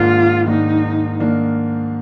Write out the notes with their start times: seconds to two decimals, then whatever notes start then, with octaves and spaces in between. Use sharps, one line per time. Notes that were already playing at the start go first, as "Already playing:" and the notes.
Already playing: G#2 D#3 A#3 D4 F4
0.47 G#2 D#3 A#3 D4 D#4
1.20 D#3 A#3 D4